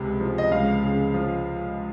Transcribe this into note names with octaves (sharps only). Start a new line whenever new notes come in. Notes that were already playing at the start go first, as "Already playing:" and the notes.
Already playing: C#2 C3
F3
D#5
C#2 F5
C#3
F3